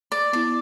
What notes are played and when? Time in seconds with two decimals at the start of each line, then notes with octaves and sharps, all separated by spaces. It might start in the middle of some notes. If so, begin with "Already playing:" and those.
0.12 D5
0.33 B3 E4 D5